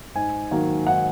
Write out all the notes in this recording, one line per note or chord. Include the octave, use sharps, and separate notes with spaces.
G#2 G#5
D#3 F#3 A#3
G#2 F#5